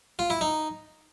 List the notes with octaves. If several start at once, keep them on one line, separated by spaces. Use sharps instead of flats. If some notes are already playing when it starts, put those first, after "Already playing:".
F4
E4
D#4